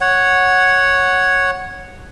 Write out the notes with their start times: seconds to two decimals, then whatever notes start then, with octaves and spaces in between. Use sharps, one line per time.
0.01 C#5 F#5